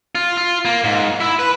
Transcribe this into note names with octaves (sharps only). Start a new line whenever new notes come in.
F4
F4
A#3
G#2
E4
B4